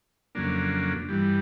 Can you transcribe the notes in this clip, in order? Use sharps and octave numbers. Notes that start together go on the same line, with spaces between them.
F2 C#3 F#3 A#3 D4
G2 E3 G3